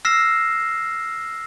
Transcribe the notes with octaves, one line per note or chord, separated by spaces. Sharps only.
E6 F6 A#6 C7 E7